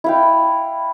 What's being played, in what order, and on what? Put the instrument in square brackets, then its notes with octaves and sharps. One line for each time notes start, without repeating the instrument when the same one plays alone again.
[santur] E4 F5 G5